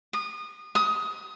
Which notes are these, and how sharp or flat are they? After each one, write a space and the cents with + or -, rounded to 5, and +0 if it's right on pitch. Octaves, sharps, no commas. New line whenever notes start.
D#6 -25
D#6 +20